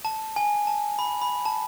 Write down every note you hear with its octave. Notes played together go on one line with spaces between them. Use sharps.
A5
G#5
A5
B5
B5
A5